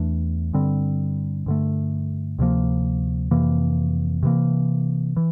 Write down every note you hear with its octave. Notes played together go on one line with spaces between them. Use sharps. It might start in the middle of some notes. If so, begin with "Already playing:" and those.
Already playing: E2 E3 A3 D4
G2 D3 G3 C4
G2 D3 A3
D2 C3 F3 A#3
F2 C3 E3 A#3
C3 E3 A#3
E3